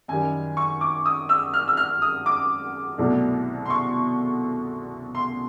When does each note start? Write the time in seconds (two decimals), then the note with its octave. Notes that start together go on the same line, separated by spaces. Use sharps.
0.08 F#2 D#3 G3 G#5
0.57 C#6
0.81 D6
1.06 D#6
1.29 E6
1.54 F6
1.68 E6
1.77 F6
2.02 D#6
2.26 D6
2.98 C2 B2 F#3 A3 D4
3.66 C6
3.70 C#6
5.15 C6